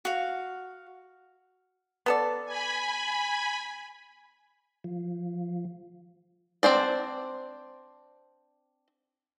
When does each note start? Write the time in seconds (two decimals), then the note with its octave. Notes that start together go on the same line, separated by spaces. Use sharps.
0.05 F#4 F5
2.06 B3 A4 D5
2.45 G#5 B5
4.84 F3
6.63 C4 D4 C5 D5